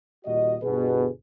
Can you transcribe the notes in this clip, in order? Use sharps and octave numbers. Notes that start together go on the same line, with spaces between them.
D#2 A#2 G3 F#4 D#5
G1 B2 G#4 B4